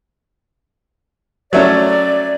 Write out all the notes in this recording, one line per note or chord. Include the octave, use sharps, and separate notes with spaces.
F#3 A3 C#4 D5